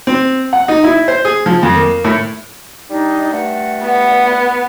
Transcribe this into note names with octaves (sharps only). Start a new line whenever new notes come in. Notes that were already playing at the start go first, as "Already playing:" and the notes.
C4
F#5
D#4
E4
C5
G#4
F3
F2
A#3
A2
G3 D4 D#4
G2 A3 F#5
B3